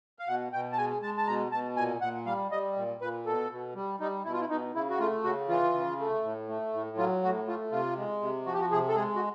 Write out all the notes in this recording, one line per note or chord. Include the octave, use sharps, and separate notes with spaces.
F5
B2 F#5
B2 G5
A5
G#3 G#5
G#3 A5
A5
B2 A#5
B2 A5
A#2 G#5
A#2 F#5
G3 F5
G3 D#5
A#2
A#2 B4
B2 A4
B2
G3
G3 D#4
B2 E4
F4
E4
B2 D#4
C#3 E4
F#4
A3 F4
C#3 F#4
E3 F4
C#3
A3
A2
A3
A2
F#3 F4
A2 F#4
A3 F4
C3 F4
G#3
C3
F3 F#4
G4
F#4
C3 G#4
A4
G#3 G#4
F#4